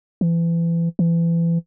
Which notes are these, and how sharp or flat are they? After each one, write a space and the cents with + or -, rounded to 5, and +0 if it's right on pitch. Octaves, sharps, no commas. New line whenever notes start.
E3 +30
E3 +30